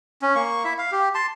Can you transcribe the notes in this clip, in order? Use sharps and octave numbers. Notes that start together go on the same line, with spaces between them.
C#4
A#3 C#6
E4 E5
F5
G4
A5 C6